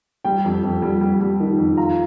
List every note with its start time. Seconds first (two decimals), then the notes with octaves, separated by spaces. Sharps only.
0.24 G3 G5
0.44 F2
0.63 F2
0.82 G3
1.01 G3
1.20 G3
1.40 D#3
1.58 F2
1.77 F4 A#5